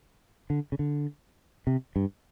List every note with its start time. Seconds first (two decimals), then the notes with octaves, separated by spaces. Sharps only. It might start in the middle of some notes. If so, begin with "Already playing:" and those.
0.50 D3
0.72 C#3
0.79 D3
1.67 C3
1.96 G2